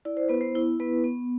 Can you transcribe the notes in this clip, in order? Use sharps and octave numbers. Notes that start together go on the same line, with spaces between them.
E4 D5
C5
B3 B4
C5
E4
B3 B4
B3